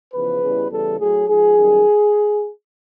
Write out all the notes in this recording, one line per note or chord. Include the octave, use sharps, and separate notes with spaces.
E2 C#3 F3 B4
E2 C#3 E3 G3
E2 C#3 E3 G3 A4
A2 F#3 G#4
G#2 F3 G#4
F#2 D#3 G3